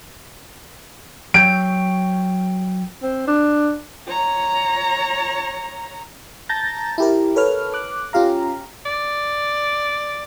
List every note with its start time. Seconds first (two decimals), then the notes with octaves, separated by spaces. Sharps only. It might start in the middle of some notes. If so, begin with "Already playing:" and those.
1.34 F#3 C#5 G5 D7
3.03 C4
3.27 D4
4.07 C#5 A#5
6.49 A5 A#5 G6 A6 A#6
6.98 E4 G4 A#4
7.36 A4 B4 C#5 F6
7.74 D6 F#6
8.13 C#4 F4 G4 F5 A#5
8.86 D5